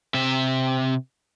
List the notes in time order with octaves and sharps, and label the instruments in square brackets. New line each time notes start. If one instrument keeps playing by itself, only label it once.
[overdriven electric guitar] C3 E5